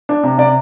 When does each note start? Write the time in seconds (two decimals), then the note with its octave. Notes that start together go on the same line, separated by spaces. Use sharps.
0.09 D4
0.23 C3
0.38 C3 D5